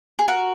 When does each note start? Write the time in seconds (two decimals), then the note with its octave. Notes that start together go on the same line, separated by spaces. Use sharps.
0.19 G#4
0.28 F#4 A#4